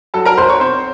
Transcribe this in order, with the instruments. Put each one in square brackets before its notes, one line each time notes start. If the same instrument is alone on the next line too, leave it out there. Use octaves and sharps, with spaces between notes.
[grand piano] F#3 A4 A5
A#4 A#5
B1 C5 C6
C#5 C#6
C4 C5 C6